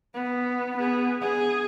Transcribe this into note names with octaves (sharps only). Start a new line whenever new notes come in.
B3
B3 G#4
G#4